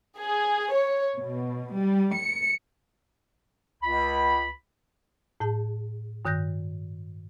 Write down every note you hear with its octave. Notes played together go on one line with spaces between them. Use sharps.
G#4
C#5
B2
G3
C#7
C#2 B5
A2 G#4 A5
G2 D#3 F#6 G6 A#6